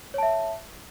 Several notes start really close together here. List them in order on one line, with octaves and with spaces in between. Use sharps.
C#5 A5 E5